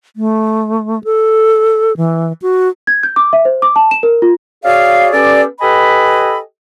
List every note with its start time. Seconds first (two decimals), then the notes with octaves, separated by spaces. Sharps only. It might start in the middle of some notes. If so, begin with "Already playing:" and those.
0.16 A3
1.04 A4
1.97 E3
2.42 F#4
2.87 G#6
3.03 G6
3.16 D6
3.33 E5
3.45 C5
3.62 D6
3.76 A5
3.91 E7
4.03 A#4
4.22 F4
4.64 C#4 F#4 G#4 D5 F5
5.13 B3 C#4 G4 A4 D5
5.60 G4 A4 B4 D#5 G#5 B5